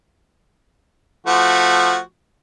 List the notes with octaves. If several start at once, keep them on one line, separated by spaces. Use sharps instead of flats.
F3 A3 F#4